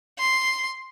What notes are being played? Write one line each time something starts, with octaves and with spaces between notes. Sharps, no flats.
C6